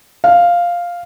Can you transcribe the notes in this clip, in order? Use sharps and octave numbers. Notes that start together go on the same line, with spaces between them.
F5